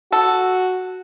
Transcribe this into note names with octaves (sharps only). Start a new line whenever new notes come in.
F#4 A4